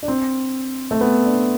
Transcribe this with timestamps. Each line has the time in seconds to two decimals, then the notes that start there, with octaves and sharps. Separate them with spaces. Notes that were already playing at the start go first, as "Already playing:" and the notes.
0.03 D4
0.08 C4
0.91 A3
1.01 B3
1.25 D4